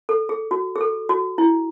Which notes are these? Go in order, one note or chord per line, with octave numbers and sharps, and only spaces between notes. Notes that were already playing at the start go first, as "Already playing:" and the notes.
A4
G#4
F#4
G#4
A4
F#4
E4